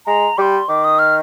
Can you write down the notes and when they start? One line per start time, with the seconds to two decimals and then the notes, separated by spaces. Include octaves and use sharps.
0.06 G#3 A#5
0.38 G3 C6 D6
0.69 D#3 D6
0.84 D#6
0.99 F6